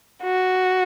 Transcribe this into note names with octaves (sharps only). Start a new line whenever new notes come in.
F#4